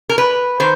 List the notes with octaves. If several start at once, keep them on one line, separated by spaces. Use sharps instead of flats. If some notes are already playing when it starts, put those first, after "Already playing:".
A#4
B4
D#3 C5